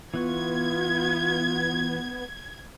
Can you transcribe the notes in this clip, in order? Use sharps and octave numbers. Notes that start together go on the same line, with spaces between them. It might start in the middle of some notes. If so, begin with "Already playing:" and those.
E3 B3 F4 B4 C#6 G#6